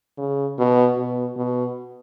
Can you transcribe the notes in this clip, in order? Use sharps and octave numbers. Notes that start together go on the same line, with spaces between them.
C#3
B2
B2
B2